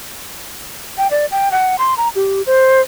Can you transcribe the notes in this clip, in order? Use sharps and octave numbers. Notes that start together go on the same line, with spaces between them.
G5
D5
G5
F#5
C6
A#5
G4
C5